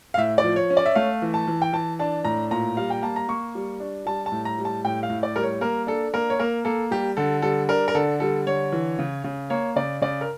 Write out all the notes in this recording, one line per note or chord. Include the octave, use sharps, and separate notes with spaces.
F5
A2 E5
D5
F3
C#5
C#4
D5
E5
A3 F5
E3
A5
E3
G5
E3 A5
D4 A5
A2 A#5
A#2 A#5
G3 F5
G5
A#3 A5
A#5
A#3 C#6
G3
D4
G3 A5
A5
A2
A#5
G3
A5
A2 G5
F5
A2
D5
G3 A#4
C#5
A#3 A#4
D4 A4
A#3 A#4
C#5
A#3 A#4
A#3 A4
G3 G4
D3 A4
G3 A4
D4 A#4
A#4
D3 A4
G3 A4
D3 C#5
E3
C#3
C#3
A#3 C#5
C#3 D5
C#3 D5
A#4